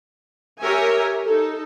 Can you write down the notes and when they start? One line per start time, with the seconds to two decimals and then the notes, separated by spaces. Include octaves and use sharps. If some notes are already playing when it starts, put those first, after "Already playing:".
0.59 G4 A#4 C#5 E5 G#5
1.24 D#4 A4